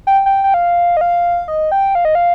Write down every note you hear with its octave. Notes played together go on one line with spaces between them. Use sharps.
G5
G5
G5
F5
D#5
F5
D#5
G5
F5
D#5
F5